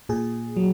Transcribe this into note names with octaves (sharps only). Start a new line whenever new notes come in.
A#2 G#4
F#3